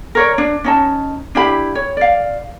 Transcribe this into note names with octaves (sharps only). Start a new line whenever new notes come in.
A#4 C#5 D5
D4
C#4 D#4 A5
D4 E4 G4 B5
C#5
D5 F5